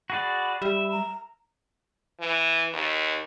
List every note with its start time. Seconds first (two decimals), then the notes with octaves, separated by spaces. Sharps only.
0.10 F#4 G#4 D5 B5
0.62 G3 E5
0.91 A#5
2.20 E3
2.73 D#2